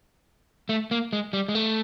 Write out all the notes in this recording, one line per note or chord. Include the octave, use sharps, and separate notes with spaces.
A3
A#3
G#3
G3
G#3
A3